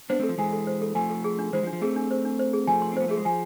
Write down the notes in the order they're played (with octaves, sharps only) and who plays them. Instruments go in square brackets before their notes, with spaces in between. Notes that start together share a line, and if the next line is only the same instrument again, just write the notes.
[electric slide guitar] B3 D4 [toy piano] C5
[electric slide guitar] A3 C4 [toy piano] A4
[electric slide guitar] F3
[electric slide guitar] E3 G#3 [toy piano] G#5
[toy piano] A4
C5
A4
[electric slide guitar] F3 A3 [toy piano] G#5
[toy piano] A4
G#4
D4
[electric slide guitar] E3 G#3 [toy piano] C5
[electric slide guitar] F3
[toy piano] D4
[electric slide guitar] F3
[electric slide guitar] A3 C4 [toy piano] G#4
[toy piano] D4
C5
D4
C5
G#4
[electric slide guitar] F3 A3 [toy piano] G#5
[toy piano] C6
[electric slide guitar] C4
[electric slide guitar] B3 [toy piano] C5
[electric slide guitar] A3 [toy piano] G#4
[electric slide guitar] G#3
[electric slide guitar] F3 [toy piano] G#5